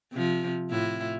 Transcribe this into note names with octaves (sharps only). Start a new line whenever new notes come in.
C3 F3
A2 E4 F4